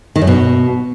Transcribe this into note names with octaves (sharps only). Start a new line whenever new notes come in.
D#3
F#2
B2